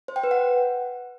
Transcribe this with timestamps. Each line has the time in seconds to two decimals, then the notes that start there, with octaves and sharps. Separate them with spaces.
0.08 C5
0.16 G5
0.24 B4
0.31 F#5